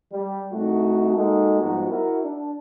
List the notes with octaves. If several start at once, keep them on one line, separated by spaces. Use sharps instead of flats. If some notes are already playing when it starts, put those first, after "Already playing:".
G3
C2 A3 D#4 F#4
G#3 A#3 D#4 F#4 A4
G#2 F3 G3 B3 F#4
E4 F#4 A#4
D4